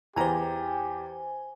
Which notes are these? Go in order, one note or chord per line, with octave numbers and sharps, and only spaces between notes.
E2 G4 C5 G#5 A#5